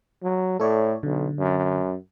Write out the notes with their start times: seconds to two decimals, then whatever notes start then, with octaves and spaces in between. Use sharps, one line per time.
0.23 F#3
0.60 A2 A4 C#5 D5
1.03 B1 D3
1.39 F#2